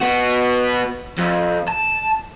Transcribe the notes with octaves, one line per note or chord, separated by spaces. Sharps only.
B3 F#4
F2
A5